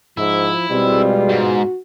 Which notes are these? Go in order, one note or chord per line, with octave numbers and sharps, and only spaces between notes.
G#2 F3 E4
B2 G3 G#3 C4 F4
G#2 F#4